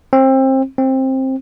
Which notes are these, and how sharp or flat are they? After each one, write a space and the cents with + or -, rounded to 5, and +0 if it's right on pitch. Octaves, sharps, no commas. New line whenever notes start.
C4 +25
C4 +15